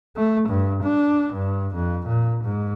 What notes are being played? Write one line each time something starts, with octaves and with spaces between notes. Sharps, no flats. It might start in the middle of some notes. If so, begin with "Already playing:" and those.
A3
G2
D4
G2
F2
A#2
G#2